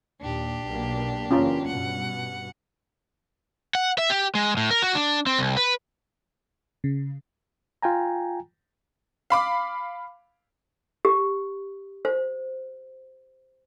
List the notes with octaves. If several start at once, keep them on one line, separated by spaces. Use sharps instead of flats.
D#2 A#2 D4 G4
B1 B2 A#3
F#1 E2 A#3 C#4 F4 A#5
G2 B2 F#5
F#5
E5
G4
G#3
A2
A#4
F#4
D4
C4
C2
B4
C#3
F4 G5 G#5 A#5
F5 B5 D6
G4
C5